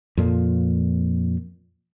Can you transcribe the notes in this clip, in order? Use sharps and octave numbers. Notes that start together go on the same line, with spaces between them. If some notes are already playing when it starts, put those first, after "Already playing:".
F2 A#2 F3